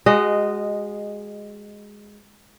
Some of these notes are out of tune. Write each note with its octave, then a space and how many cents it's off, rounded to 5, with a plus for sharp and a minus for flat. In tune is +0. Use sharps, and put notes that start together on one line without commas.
G#3 -5 F#4 +25 D#5 -10